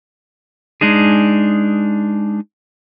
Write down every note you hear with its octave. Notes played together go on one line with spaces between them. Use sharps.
G#3 D4 D#4 G#4